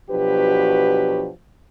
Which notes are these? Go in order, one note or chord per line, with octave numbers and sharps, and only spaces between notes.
B2 F3 F#3 D4 G4 B4